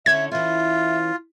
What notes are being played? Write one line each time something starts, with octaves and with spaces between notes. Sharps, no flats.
D3 C#4 D4 E5 G#6
E3 C#4 F4 E5